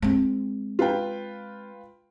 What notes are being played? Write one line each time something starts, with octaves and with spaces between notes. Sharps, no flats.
G#3 C4
F4 B4 G5